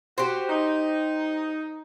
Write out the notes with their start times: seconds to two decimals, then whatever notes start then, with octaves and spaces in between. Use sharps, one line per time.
0.18 F#4 G4 C5
0.49 D#4